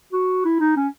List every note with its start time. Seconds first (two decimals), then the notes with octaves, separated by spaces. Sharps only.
0.13 F#4
0.45 E4
0.60 D#4
0.77 C#4